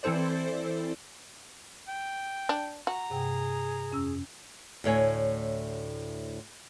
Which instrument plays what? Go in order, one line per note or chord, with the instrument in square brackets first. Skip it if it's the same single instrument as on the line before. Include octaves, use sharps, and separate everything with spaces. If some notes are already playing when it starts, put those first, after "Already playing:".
[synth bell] E3 C4 E4 A4 C5 D5
[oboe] G5
[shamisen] D4
[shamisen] F#4 [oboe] A#5
[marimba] G2 C3 G5 [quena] G#4
[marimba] F2 C#4 E6
[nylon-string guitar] D2 A2 C#5 G#5